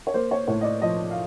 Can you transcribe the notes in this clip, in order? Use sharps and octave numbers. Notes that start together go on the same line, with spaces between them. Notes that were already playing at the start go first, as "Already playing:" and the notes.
C#5
A#3 C5
C#5
A2 C#5
D#5
D5
F3 D#5
F5